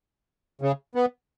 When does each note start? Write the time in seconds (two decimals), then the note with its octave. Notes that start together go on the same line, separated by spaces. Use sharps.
0.62 C#3
0.95 B3